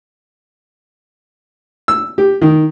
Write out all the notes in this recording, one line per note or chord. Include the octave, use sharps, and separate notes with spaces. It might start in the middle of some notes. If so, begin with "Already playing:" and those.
E6
G4
D#3